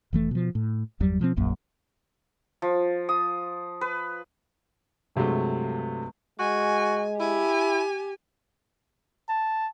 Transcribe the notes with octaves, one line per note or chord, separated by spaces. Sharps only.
F1 E3 A3
B2 F3
A2
G1 E2 F#3 G3
B2 F3 G3 C4
D1 A#1 F#2 A#3
F3
D#6
B4
G2 C3 F#3 G#3 A3
G#3 F#4 G#5
E4 G4 G#5
A5